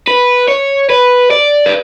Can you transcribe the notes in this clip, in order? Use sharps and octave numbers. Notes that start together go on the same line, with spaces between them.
B4
C#5
B4
D5
B4